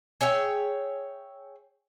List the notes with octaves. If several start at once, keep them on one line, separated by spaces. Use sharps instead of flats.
G#4 C#5 E5 G5